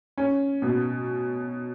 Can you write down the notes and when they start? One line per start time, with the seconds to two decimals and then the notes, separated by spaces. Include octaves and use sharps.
0.18 C#4
0.62 B2